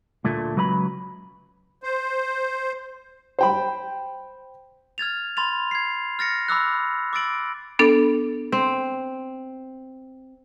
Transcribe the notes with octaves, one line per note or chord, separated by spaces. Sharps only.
D2 A#2 A3
C#2 F#3 B4 D5 B5
C5
C5 G5 B5
F6 G#6 A6 F7
B5 C6 A6 F7
G#6 C7
F6 A6 A#6 C#7
B5 D6 E6 F#6
D6 E6 A6 D7 F#7
B3 D4 A4
C4